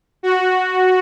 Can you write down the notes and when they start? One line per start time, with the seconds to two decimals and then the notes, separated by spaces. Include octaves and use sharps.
0.23 F#4